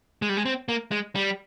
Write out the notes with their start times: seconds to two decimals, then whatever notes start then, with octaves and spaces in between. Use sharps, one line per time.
0.22 G#3
0.29 G3
0.37 G#3
0.45 C4
0.69 A#3
0.91 G#3
1.15 G3